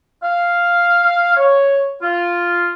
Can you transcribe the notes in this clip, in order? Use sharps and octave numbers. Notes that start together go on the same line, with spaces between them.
F5
C#5
F4